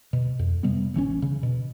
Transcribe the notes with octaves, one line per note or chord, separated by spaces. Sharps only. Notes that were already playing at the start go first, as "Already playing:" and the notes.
B2
F2
C3 G3 B3
A1 E3 A#3 C#4
C#3
B2